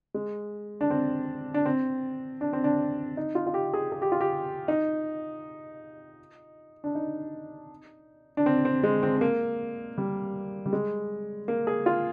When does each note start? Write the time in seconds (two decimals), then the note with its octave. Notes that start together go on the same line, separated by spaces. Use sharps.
0.14 G#3
0.81 D4
0.90 C4
1.54 D4
1.65 C4
2.41 D4
2.53 C4
2.64 D4
3.17 D#4
3.35 F4
3.47 F4
3.54 G4
3.74 G#4
3.92 G#4
4.02 G4
4.12 F4
4.21 G4
4.68 D#4
6.84 D4
6.95 D#4
8.37 D4
8.46 C4
8.65 C4
8.83 G#3
9.03 C4
9.17 C4
9.21 A#3
9.98 G3
10.66 G3
10.73 G#3
11.48 A#3
11.67 G#4
11.86 F4